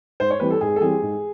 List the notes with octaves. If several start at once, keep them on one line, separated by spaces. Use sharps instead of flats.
G#2 C5
C#5
E3 G3 C4 B4
A4
G#2 G#4
A4
E3 G3 C4 G#4
G#2